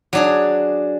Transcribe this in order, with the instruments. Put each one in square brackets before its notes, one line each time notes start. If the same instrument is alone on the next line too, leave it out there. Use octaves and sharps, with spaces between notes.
[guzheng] F#3 D4 G#4